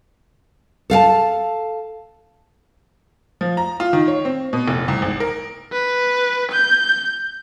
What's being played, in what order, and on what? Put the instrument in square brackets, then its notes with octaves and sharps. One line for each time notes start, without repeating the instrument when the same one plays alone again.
[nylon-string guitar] A4 F5 F#5 A5
[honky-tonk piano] F3
A#5
F4
D#3
C#5
C4
B2
F1
C2
G#1
A#4
[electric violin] B4
G6